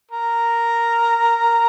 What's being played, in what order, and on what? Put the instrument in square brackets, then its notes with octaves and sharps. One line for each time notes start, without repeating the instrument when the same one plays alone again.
[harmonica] A#4